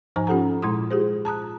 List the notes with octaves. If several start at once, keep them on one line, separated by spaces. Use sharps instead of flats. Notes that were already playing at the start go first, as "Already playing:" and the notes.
G#2 F3 D#4 C5 G#5 A#5
C#4 F4 G4 A4 F#5 A#5
A#2 G#3 E4 C6 D#6
F4 G4 G#4 C5
A5 A#5 D#6 F#6